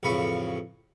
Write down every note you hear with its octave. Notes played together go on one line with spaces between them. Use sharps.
A1 F2 C#3 B5 C#6